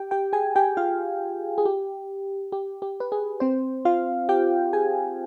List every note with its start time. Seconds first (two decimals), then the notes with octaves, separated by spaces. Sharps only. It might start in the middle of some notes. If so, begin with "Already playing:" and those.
Already playing: G4 G5
0.11 G4 G5
0.33 G#4 G#5
0.56 G4 G5
0.77 F4 F5
1.58 G#4
1.65 G4
2.52 G4
2.82 G4
3.00 B4
3.12 G#4
3.40 C4 C5
3.85 F4 F5
4.29 G4 G5
4.73 G#4 G#5